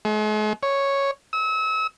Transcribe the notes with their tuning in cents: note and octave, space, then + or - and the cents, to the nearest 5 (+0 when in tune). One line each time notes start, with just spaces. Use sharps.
G#3 +45
C#5 -5
E6 -35